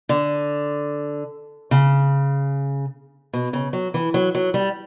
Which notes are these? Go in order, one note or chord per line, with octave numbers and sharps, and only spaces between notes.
D3
C#3
B2
C#3
F#3
E3
F#3
F#3
G3